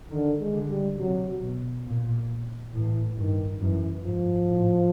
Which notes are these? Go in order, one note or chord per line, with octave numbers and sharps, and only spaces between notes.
D3 D#3
G#3
D3
G3
C3 F#3
B2
A#2
A2 E3
G2 D#3
F#2 E3
G#2 F3
A2